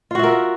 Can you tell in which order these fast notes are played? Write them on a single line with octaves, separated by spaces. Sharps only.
F4 F#4 E5 A#4